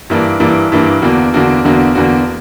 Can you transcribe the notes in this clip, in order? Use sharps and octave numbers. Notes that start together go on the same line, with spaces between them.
G2 E3 A#3 D4
G2 E3 A#3 D4
G2 E3 A#3 D4
E2 D3 A#3 D4 F#4
E2 D3 A#3 D4 F#4
E2 D3 A#3 D4 F#4
E2 D3 A#3 D4 F#4